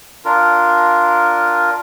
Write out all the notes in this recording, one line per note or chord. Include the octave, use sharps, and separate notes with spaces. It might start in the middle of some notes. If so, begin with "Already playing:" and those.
D4 F4 A#4